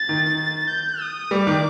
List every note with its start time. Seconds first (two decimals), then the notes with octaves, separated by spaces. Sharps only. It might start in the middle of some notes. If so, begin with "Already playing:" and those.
Already playing: A6
0.09 D#3
0.70 G6
1.01 D#6
1.31 G3 D6
1.47 D#3